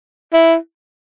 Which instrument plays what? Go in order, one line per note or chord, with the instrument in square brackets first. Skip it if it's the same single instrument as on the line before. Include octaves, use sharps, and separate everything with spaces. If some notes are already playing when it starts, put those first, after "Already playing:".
[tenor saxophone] E4